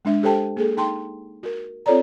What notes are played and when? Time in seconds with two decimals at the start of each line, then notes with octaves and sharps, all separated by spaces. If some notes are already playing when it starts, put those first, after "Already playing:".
0.05 G#3 D4 E5
0.23 G4 A4 C5 G5 A5
0.57 A#3 G#4 A4
0.77 D#4 G5 A5 C6
1.43 F#4 A#4
1.86 C4 F4 A4 C#5 D5 A#5